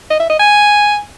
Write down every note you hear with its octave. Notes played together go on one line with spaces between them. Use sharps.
D#5
E5
D#5
G#5